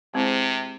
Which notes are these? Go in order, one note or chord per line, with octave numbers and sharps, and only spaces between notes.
C3 G#3 C4 E4 G#4 C5